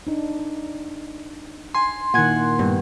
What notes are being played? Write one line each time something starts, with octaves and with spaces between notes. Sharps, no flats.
D4 D#4
G#5 C6
A#2 D#3 E4 F#5 G#5 G#6
G2 B3